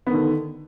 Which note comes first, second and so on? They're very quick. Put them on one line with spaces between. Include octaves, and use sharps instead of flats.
B3 D#3 D3